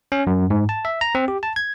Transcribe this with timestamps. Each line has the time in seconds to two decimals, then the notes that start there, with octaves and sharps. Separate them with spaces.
0.12 C#4
0.27 F#2
0.50 G#2
0.69 A5
0.85 E5
1.01 A#5
1.15 C4
1.28 G4
1.43 A5
1.56 G#6